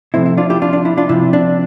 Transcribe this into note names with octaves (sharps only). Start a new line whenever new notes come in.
C3 F3 A3 C4 E4
E4
D4 F4
E4 G4
D4 F4
D4
E4
D4 F4
C3 F3 C4 E4
D4